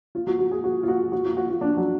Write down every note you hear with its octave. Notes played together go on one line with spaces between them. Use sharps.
F4
F#4
F#4
G#4
F#4
F4
F#4
F#4
F4
F#4
F4
D4
F#3